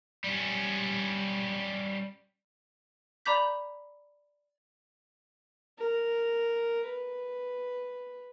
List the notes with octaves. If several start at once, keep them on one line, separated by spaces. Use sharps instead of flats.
G3 C#4
D5 A#5 B5 D6 G6 B6
A#4
B4